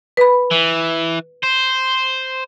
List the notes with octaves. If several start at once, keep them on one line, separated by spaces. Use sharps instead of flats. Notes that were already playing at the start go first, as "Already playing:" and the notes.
B4 B5
E3
C5